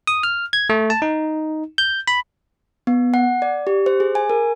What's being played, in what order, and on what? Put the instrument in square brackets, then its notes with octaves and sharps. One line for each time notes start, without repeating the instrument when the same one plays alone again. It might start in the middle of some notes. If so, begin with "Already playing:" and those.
[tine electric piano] D#6
F6
G#6
A3
A5
D#4
G6
B5
[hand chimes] B3
F#5
D5
G4
C5
G#4
G#5
A#4